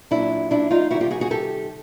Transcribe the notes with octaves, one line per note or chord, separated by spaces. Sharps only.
A#2 F#3 D4 E4
D4 E4
D#4 F4
C3 D#3 G3 E4 F#4
F4 G4
F#4 G#4
F#4 G#4
G4 A4